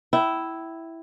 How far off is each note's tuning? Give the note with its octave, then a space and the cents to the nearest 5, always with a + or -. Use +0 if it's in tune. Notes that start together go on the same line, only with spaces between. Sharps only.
E4 +0 G5 -30